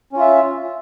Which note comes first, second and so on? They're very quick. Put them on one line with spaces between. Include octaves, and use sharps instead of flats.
C#4 F4 E5